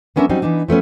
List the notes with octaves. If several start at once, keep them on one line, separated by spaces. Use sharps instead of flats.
F#3 B3 C#4 D4 A#4 E5
F#3 G3 C4 C#4 D#4
E3 B3 D4 D#4
F3 A3 B3 C#4